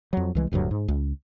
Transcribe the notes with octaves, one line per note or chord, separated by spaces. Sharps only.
F2 F#3
C2 E3 G#3
D1 D2 G2 F#3
G#2
C#2